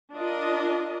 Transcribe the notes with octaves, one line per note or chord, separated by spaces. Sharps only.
D4 F4 A#4 D#5